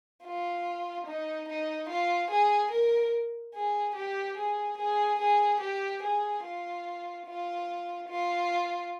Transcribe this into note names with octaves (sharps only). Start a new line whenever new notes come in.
F4
D#4
D#4
F4
G#4
A#4
G#4
G4
G#4
G#4
G#4
G4
G#4
F4
F4
F4